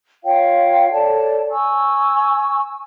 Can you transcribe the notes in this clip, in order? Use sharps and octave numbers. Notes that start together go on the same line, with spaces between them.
F4 C#5 F5 G5
A4 C#5 D5 A5
G#5 C#6 E6